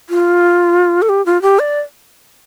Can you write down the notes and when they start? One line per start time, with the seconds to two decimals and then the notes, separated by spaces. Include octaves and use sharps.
0.10 F4
1.02 A4
1.09 G4
1.26 F4
1.42 G4
1.59 D5